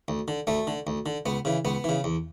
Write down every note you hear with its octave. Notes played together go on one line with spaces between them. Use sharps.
D2
D3
D2 A3
D3
D2
D3
C#2 B3
C#3 E3
C#2 B3
C#3 E3
E2